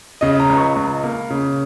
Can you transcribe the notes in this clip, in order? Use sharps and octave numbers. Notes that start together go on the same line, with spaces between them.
C#3 D#5
A#5
C#2
C#6
C#2
A#3
C#3